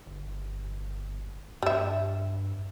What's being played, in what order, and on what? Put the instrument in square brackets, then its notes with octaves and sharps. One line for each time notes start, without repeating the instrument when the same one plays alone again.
[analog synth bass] G1
[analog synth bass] G2 [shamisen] G3 E5